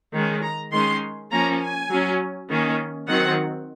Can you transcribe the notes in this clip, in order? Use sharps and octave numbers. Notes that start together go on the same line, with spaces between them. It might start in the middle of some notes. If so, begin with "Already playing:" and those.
D#3 G#3 C#4
A#5
D#3 G#3 C#4 C6
F3 A#3 C#4 A#5
G#5
F#3 C#4
D#3 A#3 C#4
D#3 F#3 C4 F#5